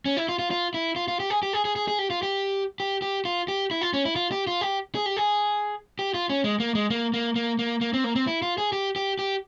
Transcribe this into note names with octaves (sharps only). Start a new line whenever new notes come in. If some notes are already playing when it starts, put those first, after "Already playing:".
C#4
E4
F4
F4
F4
E4
F4
F4
G4
G#4
G4
G#4
G#4
G#4
G#4
G4
F4
G4
G4
G4
F4
G4
E4
F4
C#4
E4
F4
G4
F4
G4
G#4
G4
G#4
G4
F4
C#4
G#3
A#3
G#3
A#3
A#3
A#3
A#3
A#3
C4
A#3
C4
E4
F4
G#4
G4
G4
G4